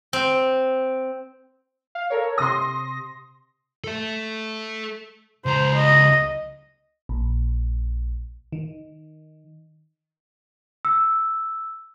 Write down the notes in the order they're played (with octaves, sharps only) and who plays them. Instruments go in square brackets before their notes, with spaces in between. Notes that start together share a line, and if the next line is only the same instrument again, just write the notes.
[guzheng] C4
[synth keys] F5
A4 A#4 C#5
[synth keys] C3 A#6 [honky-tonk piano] C6 D#6
[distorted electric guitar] A4 E5
[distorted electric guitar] C#2 A#5 [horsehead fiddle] C5
[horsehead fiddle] D#5
[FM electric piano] A#1
D#3
[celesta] E6